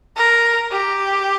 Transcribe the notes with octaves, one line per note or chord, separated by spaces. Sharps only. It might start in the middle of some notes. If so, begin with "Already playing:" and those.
A#4
G4